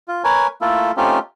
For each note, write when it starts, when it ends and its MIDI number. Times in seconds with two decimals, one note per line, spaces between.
0.08 0.23 65
0.24 0.47 70
0.24 0.47 71
0.24 0.47 73
0.24 0.47 80
0.61 0.92 57
0.61 0.92 58
0.61 0.92 64
0.61 0.92 65
0.61 0.92 69
0.97 1.19 57
0.97 1.19 60
0.97 1.19 61
0.97 1.19 63
0.97 1.19 65
0.97 1.19 67